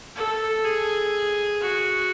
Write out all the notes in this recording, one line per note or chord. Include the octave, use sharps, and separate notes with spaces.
A4
G#4
F#4